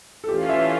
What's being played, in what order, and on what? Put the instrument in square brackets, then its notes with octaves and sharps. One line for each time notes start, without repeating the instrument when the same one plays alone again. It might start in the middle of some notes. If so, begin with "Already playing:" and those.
[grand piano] A4
[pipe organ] E3 A3 C#4 F4 [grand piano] G4
[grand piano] E5